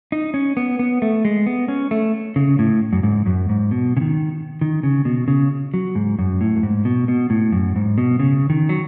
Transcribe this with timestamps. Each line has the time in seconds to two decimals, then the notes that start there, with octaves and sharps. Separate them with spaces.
0.12 D#4
0.34 C#4
0.57 B3
0.79 B3
1.02 A3
1.25 G#3
1.46 B3
1.68 C#4
1.91 A3
2.36 C#3
2.59 A2
2.93 F#2
3.03 G#2
3.26 F#2
3.49 G#2
3.71 B2
3.97 C#3
4.01 D#3
4.61 D#3
4.83 C#3
5.05 B2
5.28 C#3
5.74 F#3
5.95 G#2
6.19 F#2
6.41 A2
6.56 F#2
6.63 G#2
6.85 B2
7.08 B2
7.30 A2
7.52 F#2
7.76 G#2
7.98 B2
8.20 C#3
8.50 D#3
8.69 F#3